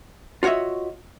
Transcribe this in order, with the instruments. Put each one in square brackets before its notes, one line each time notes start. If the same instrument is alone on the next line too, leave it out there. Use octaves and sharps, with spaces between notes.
[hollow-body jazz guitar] F4 F#4 C#5 D#5 E5